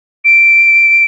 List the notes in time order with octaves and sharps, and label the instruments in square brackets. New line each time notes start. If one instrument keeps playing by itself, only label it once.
[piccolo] D7